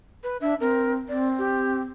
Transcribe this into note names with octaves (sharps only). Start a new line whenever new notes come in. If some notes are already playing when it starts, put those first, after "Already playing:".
B4
D4 E5
C4 A#4
C4 D5
G4